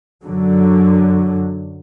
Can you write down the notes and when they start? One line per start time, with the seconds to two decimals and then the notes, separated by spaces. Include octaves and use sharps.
0.23 F#2 D3 F#3